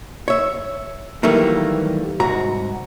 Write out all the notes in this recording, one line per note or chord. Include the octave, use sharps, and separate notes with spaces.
C#5 E5
D#3 E3 F#3 G3 A3 A#3
C2 G#2 F#4 A#5